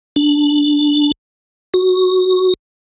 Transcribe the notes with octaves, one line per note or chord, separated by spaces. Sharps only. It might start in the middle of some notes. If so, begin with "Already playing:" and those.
D4
F#4